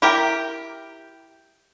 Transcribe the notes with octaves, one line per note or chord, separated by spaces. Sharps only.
E4 G4 A#4 G5